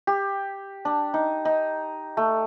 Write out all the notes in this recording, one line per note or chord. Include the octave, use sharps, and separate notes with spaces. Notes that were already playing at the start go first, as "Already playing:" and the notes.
G4
D4
D#4
D#4
A3